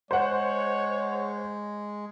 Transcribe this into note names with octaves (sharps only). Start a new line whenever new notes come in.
G#3 C5 C#5 F#5